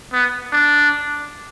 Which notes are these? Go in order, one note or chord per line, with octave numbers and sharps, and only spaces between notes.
B3
D4